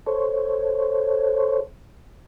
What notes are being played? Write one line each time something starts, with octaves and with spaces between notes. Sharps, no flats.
A4 C5 C#5